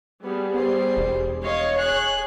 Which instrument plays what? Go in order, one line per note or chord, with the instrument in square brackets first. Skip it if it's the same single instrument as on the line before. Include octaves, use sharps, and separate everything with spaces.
[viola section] G3 G#4 [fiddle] B3
[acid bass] B3 [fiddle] C5
[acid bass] E1
[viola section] C#5 [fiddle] D#5 F5
[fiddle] G#4 F#6